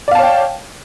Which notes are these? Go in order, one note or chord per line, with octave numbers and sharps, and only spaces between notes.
C#5 D5 F5 G5 A5